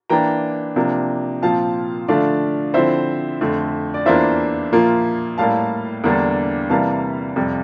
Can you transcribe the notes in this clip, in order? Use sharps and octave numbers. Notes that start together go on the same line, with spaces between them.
E3 A#3 D4 G5 A#5
C3 F3 A#3 D4
A#2 F3 C4 F4 F5 A5
D3 F3 A3 D4 D5 F5
D3 F3 C4 E4 C5 E5
F2 D3 A3
D5
E2 E3 A#3 D4 F4 C5 E5
A#2 F3 A#3 F4
A2 G3 A#3 F5 A5
E2 D3 G3 A#3 D4
C3 E3 G3 A#3 F5 A5
F2 C3 G3